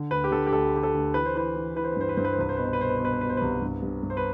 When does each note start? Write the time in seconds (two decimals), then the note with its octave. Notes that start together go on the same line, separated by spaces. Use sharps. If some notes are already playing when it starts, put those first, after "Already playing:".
Already playing: D3
0.11 D2 B4
0.24 G4
0.31 D3 A4
0.47 G4
0.52 D2 A4
0.73 D3 G4
0.83 A4
0.94 D2
1.14 E3 B4
1.25 C5
1.35 E3 B4
1.56 E3
1.76 E3 B4
1.84 C5
1.92 B4
1.97 G2 C5
2.09 B4
2.17 G2 C5
2.25 B4
2.33 C5
2.39 C2 B4
2.49 C5
2.57 B2 B4
2.65 C5
2.73 B4
2.80 B2 C5
2.89 B4
2.97 C5
3.00 B2 B4
3.13 C5
3.21 B2 B4
3.29 C5
3.37 C2 B4
3.62 G2
3.83 G2
4.03 G2
4.10 C5
4.17 B4